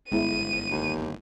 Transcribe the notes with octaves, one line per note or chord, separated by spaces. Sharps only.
G1 G#3 B3 E4 D#7
D#2